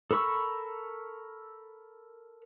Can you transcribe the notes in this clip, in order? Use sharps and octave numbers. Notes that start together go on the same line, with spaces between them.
A4 A#4 B5 C#6 E6